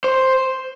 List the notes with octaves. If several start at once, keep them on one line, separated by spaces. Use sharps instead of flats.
C5